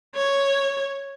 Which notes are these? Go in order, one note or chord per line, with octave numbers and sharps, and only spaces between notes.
C#5